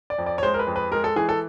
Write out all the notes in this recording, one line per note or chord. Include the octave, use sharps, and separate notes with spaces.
D5
F2
D5
C#5
G#3 C5
A#4
B4
F2
B4
G#3 A#4
A4
E3 G#4
A4